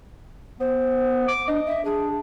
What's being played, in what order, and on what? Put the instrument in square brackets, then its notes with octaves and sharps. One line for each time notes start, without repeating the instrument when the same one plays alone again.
[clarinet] B3 [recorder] C5
[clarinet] D6
[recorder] D4 [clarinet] D#5
[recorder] E5
[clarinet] D4 [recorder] G#4